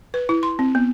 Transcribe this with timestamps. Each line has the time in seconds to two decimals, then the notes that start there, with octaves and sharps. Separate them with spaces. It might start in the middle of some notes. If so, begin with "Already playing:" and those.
0.14 B4
0.29 E4
0.43 C6
0.59 C4
0.75 B3